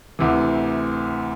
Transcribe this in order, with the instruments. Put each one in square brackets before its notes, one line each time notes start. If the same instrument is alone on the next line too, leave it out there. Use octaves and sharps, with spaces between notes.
[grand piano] D2 C3 E3